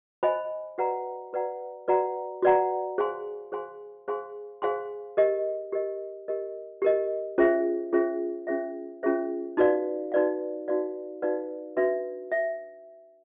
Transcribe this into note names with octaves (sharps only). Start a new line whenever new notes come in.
C5 D#5 G#5 B5
F#4 B4 D5 F#5 A#5
F#4 B4 D5 F#5 A#5
F#4 B4 D5 F#5 A#5
F#4 B4 D5 F#5 A#5
G#4 C5 F5 G#5 C6
G#4 C5 F5 G#5 C6
G#4 C5 F5 G#5 C6
G#4 C5 F5 G#5 C6
G4 A#4 D#5
G4 A#4 D#5
G4 A#4 D#5
G4 A#4 D#5
C#4 F4 G#4 C5 E5
C#4 F4 G#4 C5 E5
C#4 F4 G#4 C5 E5
C#4 F4 G#4 C5 E5
D#4 F#4 B4 D5 F5
D#4 F#4 B4 D5 F5
D#4 F#4 B4 D5 F5
D#4 F#4 B4 D5 F5
D4 F#4 B4 E5
E5